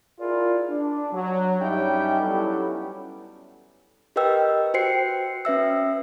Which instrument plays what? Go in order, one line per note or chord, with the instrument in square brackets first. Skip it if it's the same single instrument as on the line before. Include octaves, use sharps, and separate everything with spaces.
[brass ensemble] E4 F4 G#4 A#4 D5
D4
F#3
G2 G3 C#4 D#4 E5 G5
F#3 G3 B3 C#4 E4 A4
[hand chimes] G4 A#4 B4 D#5 G5 E6
F#4 C5 G5 C7 C#7
C#4 B4 E5 E6